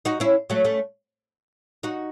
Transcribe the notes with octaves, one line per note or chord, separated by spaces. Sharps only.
D#4 F#4
C#4 E4
F#3 A3
A3 C#4
D#4 F#4